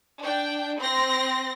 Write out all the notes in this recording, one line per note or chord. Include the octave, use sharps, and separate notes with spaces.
D4 G5
C4 C6 A#6